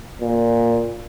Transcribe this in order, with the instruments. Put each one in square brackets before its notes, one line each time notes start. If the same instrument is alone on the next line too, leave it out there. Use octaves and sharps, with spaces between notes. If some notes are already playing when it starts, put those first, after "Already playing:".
[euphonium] A#2